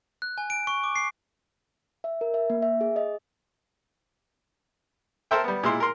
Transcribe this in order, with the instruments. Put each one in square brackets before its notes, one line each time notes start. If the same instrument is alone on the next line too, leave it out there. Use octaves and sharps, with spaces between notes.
[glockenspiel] F#6
G#5
D7
C#6
D6
C7
[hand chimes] E5
A#4
E5
A#3
E5
G#4
D#5
[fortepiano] A4 A#4 C5 E5 G5
G3 B3
A#2 G#3 E4 C6
A#4 C6